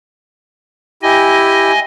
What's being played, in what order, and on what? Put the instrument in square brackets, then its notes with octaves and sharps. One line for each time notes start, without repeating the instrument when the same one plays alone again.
[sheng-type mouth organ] E4 G4 [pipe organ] D#5 G#5